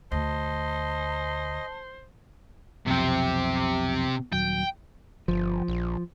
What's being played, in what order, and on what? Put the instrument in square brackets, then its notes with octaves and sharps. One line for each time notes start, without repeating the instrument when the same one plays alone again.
[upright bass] D2 [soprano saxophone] C5 [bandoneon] D#5 [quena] A5
[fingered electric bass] B1 F2 [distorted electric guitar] C3 G4
[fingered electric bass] D#1 F#3 [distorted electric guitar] G5
[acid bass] G1 [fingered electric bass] F3
[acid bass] A#1